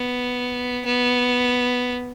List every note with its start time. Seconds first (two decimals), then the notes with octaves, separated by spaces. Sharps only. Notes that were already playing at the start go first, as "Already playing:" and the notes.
Already playing: B3
0.85 B3